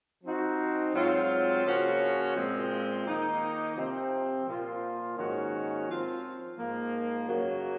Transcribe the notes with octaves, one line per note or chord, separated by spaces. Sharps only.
F3 C4 D#4 F#4
G#2 F#3 C4 F4
C#3 F3 A#3 C#4 F#4
A#2 F3 G#3 C4
D#3 A#3 D#4
C3 F3 C4
A#2 F3 A#3 F4
G#2 D#3 A#3 C#4 F#4
F3 C4 F4
G#2 F3 A#3
F#2 C#3 F#3 A#3